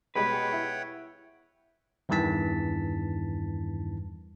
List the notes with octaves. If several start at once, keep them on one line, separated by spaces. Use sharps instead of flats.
B2 G3 G#3 B4 C#5 F#5 G5
E4
E2 G2 D#3 E3 A5 B6